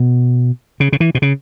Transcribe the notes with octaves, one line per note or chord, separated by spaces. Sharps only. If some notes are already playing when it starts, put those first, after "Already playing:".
Already playing: B2
C#3
C#3
E3
B2
C#3